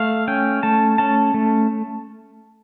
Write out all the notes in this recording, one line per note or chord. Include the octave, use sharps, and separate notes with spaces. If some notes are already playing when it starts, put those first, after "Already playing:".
Already playing: A3 F5
C#4 G5
A3 A5
C#4 A5
A3